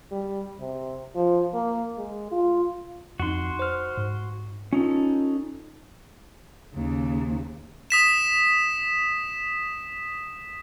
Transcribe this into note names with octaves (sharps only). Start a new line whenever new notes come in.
G3
C3
F3
A#3
G#3
F4
F2 D#4 F#4 C6
C5 F6
G#2
C#4 D#4 F4 A4
D#2 C#3
D#6 B6 E7